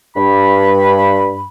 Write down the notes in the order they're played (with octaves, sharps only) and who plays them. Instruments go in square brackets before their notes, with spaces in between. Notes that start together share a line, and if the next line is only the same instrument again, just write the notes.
[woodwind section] G2 B5